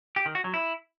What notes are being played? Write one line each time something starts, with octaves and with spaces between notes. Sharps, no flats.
G4
D#3
F#4
F#3
E4